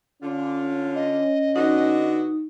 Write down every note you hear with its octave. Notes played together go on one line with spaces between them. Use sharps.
D3 C#4 F4
D#5
D3 B3 D#4 F#4